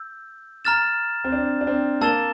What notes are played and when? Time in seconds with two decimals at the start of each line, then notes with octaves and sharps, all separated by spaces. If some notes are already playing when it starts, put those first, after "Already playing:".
Already playing: E6 G6
0.65 A#5 F6 A6 E7
1.24 C4
1.32 D4
1.61 D4
1.67 C4
2.01 A#3 A5 E6 A6 E7 G7